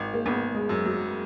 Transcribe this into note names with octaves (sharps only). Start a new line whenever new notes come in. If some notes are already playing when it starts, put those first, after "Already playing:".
Already playing: G#1 D#4
A#3
G#1 B3
G#3
F#2
F#3